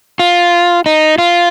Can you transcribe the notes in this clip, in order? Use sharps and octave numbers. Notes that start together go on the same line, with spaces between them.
F4
D#4
F4